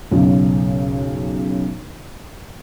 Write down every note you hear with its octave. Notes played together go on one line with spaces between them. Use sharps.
B1 F#2 C#3